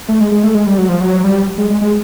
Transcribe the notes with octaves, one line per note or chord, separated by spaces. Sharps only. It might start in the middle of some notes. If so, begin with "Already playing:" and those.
A3
G#3
G#3
A3
G#3
G3
F#3
F3
F#3
G3
G#3
G#3
G#3